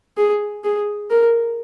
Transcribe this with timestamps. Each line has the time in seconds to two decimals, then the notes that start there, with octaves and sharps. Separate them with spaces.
0.17 G#4
0.64 G#4
1.10 A#4